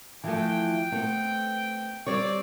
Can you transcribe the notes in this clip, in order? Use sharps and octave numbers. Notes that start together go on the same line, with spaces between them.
E3 F3 A3 G5
A3 B3 C4
G3 C4 C#5 D5